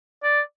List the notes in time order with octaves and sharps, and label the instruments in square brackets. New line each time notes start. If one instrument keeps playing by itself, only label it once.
[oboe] D5